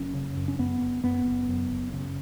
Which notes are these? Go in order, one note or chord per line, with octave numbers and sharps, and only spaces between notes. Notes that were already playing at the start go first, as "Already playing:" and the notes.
Already playing: F#1 F#2 C#4
C#3
F#2
C#4
F#2 B3
F#1
F#2 B3
F#1
F#2
F#1
C#3